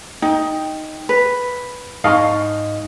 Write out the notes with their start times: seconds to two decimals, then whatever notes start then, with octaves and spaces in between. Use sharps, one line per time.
0.22 D#4 G5
1.09 B4
2.04 G#2 D#4 D#5 F5 A5 C#6